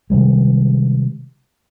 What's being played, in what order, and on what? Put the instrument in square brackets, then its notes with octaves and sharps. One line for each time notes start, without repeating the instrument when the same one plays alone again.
[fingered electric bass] C3 D#3 G3 G#3